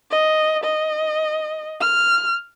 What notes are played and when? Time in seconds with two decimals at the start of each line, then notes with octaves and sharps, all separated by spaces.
0.11 D#5
0.64 D#5
1.81 F6